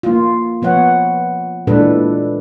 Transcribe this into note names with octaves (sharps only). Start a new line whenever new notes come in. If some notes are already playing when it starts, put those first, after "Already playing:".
A#3 F4
F3 B3 C#5 F#5
A#2 E3 G#3 D4 A4 B4